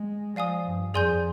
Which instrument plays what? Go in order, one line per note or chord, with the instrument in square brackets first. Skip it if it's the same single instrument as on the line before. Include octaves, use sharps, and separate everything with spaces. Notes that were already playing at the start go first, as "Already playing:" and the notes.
Already playing: [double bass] G#3
[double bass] F3 [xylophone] D5 F5 G#5 D#6
[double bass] G2
[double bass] F2 [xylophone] G#4 D5 G#5 C6 G6